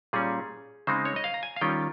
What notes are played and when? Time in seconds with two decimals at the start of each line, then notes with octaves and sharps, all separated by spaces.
0.13 A#2 G3 C#4 G#4
0.87 C#3 G#3 C4 D#4 C5
1.05 C#5
1.16 D#5
1.24 F5
1.34 A#5
1.43 G#5
1.56 F5
1.61 D#3 G3 C#4 F4 G5